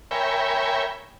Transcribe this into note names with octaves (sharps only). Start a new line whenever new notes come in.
A#4 C#5 E5 G5 G#5 B5